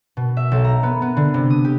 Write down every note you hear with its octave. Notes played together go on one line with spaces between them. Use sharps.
B2
E5
B1
A#5
B3
B3
D3
C3
D#6
G4